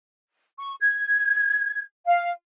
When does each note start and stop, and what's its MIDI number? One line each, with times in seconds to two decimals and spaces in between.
0.59 0.74 85
0.81 1.83 92
2.06 2.31 77